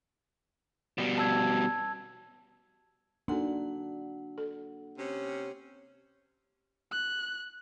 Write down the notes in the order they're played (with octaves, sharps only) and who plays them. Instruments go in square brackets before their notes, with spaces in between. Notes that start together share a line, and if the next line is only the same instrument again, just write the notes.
[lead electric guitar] B2 G3
[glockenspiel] A5 E6 G#6
[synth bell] A#3 F#5 [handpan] D4 F#4 [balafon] D#4 A4 G#5
[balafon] A4
[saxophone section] C3 C#4
[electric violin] F#6